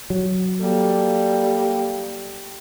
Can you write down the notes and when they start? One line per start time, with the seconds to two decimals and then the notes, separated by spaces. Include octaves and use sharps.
0.10 F#3
0.61 G3 A#3 A4